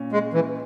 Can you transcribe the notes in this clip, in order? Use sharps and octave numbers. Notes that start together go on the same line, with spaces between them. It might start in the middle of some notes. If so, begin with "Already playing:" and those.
Already playing: A#2 C#4
G#3
E3